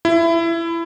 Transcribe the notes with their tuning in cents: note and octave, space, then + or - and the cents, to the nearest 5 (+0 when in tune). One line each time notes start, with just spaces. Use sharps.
E4 +20